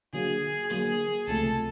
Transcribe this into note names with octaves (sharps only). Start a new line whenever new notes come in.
D3 F#3 A#3 G#4
D3 F#3 A#3 G#4
C#2 C3 F3 A3 A4